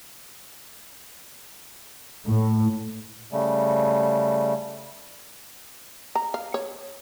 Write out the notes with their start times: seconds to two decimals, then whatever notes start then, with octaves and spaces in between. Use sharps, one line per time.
2.25 A2
3.32 C#3 G3 A3
6.15 A#5
6.34 F5
6.54 C#5